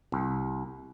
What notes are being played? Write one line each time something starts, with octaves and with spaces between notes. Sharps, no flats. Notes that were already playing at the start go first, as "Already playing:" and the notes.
C2